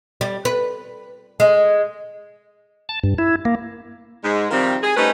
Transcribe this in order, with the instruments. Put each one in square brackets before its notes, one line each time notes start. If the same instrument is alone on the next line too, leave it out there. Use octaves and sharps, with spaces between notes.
[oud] G3
B4
G#3
[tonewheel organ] A5
G2
E4
A#3
[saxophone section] G#2 G#3
C3 D#3 F3 G3 C4
G#4
G3 A3 C#4 D#4 B4 C5